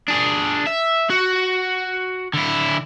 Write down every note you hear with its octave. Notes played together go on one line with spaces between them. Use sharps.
D4 G#4
E5
F#4
D3 E4